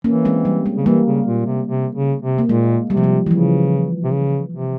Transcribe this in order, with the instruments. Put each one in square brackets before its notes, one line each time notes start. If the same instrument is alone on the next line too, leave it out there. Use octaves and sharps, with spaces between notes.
[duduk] E3 [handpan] A#3 C#4
[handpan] G#3 C4
G3
G#3
[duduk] C#3
[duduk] E3 [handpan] G3 A#3
[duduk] C#3
A#2
C3
C3
C#3
C3
[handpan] A#3
[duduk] A#2 [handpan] G#3
[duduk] C3 [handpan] G3
[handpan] F3
G3
E3
[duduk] C#3 [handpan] F3
[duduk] C3
C#3
C3